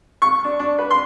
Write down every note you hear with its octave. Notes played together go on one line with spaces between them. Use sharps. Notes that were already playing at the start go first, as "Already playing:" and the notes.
C#6
D4
D4
B4
C6